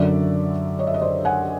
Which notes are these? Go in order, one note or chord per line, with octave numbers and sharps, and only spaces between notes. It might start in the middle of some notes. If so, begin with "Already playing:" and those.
Already playing: F#2 D3 F#3 D5 E5
C#5 D#5
E5
D#5
C5 D5
F#5 G#5